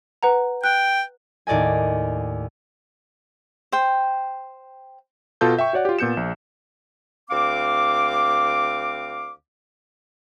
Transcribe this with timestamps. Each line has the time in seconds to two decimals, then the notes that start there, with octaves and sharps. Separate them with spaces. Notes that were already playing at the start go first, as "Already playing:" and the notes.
0.23 B4 F#5 A#5
0.64 G5 F#6
1.47 D#2 A2 D5 D#5 G#5
3.72 C5 G5
5.41 B2 F4 A4 A5 G6
5.58 E5 G5 C#6
5.73 F#4 C#5 D5 F#5
5.85 F4 G4
5.99 A#2 B3 G6 C#7 E7
6.17 A#1
7.30 D2 C4 F5 D6